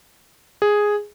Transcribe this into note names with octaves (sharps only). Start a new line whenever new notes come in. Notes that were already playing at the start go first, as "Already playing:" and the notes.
G#4